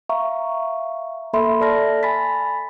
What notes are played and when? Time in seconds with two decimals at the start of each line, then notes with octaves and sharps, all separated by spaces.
0.09 E5 F5 A#5 C#6
1.33 A#3 A4 E5 B5 C6
1.60 A4 D5 A5 F6 A#6
2.03 G#5 B5 A6 B6